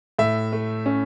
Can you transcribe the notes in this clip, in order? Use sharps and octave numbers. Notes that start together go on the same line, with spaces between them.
A2 E5
A3
C#4